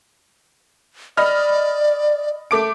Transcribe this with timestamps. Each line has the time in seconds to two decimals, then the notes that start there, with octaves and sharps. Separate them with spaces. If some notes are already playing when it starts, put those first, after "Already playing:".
1.17 D5 D#5 B5 F6
2.51 A3 D6 D7